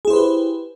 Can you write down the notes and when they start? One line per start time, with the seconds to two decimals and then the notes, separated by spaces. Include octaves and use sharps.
0.05 G#4
0.08 E4
0.10 C5
0.13 B4
0.16 G4